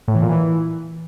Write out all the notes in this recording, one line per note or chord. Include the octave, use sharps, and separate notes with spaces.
A2
E3
A#2
E3